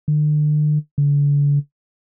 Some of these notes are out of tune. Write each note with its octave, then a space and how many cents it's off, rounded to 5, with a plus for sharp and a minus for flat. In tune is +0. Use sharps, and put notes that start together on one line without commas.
D3 +40
D3 -40